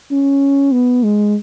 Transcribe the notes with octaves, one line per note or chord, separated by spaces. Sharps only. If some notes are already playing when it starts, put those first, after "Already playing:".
C#4
B3
G#3